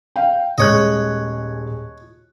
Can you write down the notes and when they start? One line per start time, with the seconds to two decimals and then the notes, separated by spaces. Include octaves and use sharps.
0.16 F5 G5
0.58 D#1 G#3 C#5 D#5 F#6